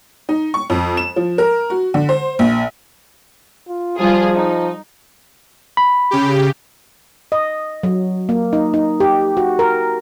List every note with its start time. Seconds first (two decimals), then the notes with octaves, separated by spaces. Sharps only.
0.29 D#4
0.54 C#6
0.70 F2
0.97 E7
1.16 F3
1.38 A#4
1.70 F#4
1.94 D3
2.09 C5
2.39 A#1
3.68 F4
3.99 F3 G3 F4 G#4
4.37 D#4
5.77 B5
6.11 C#3 G4
7.32 D#5
7.83 F#3
8.29 A#3
8.53 D#4
8.74 D#4
9.00 G4
9.37 F#4
9.59 A#4